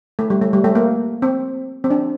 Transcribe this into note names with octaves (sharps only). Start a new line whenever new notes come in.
A3
G3
A3
G3
A3
A#3
C4
C4
D4